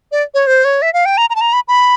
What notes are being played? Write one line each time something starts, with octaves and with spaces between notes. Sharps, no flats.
D5
C#5
C5
C#5
E5
F5
G5
A#5
A#5
A5
A#5
B5
B5